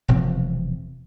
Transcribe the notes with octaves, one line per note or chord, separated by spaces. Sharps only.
E1 C3 F3 C4